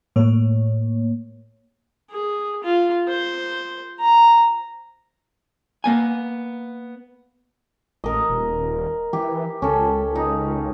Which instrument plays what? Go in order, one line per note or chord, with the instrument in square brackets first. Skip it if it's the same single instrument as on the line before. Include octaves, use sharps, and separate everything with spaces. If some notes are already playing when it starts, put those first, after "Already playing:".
[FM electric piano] A2 A#3 C#5
[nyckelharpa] G#4
F4
C5
A#5
[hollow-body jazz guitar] A#3 B3 G#5
[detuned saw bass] A1 [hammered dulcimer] A#4 D#5
[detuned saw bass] D#1
[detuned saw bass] E3 [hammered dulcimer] G4
[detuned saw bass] C#2 [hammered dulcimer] C#4 A4
[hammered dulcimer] D#4